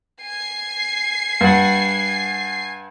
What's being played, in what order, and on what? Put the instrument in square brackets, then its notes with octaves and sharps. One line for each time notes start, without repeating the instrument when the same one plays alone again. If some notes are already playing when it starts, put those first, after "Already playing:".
[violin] G#5 C7
[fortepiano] G2 F#5